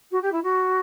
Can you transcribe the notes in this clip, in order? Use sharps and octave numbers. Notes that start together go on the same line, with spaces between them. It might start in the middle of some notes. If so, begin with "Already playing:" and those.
F#4
G4
E4
F#4